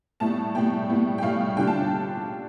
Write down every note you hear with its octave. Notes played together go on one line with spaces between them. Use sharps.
A2 G3 B3 E4 A5
A2 G3 B3 E4 G5
A2 G3 B3 E4
G5
A2 G3 B3 E4 F5
D3 G3 D4 F4 G5
A5